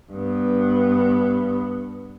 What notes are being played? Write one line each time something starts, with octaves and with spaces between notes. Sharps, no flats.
G2 B3